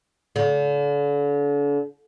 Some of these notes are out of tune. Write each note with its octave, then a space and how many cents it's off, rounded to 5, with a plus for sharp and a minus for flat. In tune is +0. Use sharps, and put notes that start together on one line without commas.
D3 -40